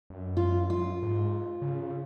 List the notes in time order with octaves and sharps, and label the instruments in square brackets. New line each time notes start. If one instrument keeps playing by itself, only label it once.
[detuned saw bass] F#2
[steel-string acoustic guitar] F4
F4
[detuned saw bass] G#2
C#3